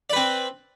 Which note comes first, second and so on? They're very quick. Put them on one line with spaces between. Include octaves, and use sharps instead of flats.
D5 B4 C4